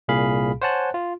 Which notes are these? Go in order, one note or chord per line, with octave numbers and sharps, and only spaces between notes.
C2 A#2 G#4 F5 B5
C5 C#5 F#5 G#5 A5 F#6
F4